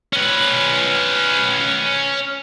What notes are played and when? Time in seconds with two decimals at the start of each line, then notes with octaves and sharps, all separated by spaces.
0.13 C#4 B4